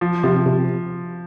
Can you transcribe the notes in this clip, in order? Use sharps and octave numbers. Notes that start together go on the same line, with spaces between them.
F3
C3 F3
C3